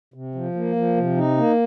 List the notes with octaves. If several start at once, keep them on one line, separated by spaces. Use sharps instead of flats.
C3
F3
A#3
F3
C3
D#4
A#3